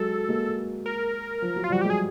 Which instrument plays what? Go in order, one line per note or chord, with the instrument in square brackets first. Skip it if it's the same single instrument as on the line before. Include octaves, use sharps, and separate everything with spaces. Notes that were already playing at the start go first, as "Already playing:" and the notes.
Already playing: [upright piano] F#3 G#3 [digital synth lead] A4
[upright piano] G#3 A#3
[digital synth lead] A#4
[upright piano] F3
F#3
[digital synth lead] F4
[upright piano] F3 G3 [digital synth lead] F#4
[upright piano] F#3 G#3 [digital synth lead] G4
[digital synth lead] G#4